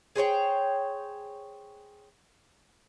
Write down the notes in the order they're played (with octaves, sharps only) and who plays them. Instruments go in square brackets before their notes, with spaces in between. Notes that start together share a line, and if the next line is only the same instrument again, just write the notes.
[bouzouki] G#4 C5 C#5 G5